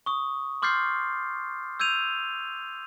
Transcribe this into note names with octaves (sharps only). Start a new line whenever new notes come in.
C#6 D#6
C6 D6 F6 G6 A6 C7
E6 G6 G#6 D#7 F7